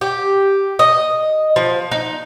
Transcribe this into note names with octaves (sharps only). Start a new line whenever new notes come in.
G4
D#5
F3
D#4